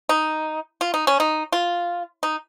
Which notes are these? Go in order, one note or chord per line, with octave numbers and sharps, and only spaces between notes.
D#4
F4
D#4
C#4
D#4
F4
D#4